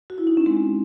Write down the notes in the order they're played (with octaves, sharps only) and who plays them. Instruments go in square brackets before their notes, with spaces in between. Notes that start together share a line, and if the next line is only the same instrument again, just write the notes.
[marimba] F#4
E4
D#4
C#4
G#3 C4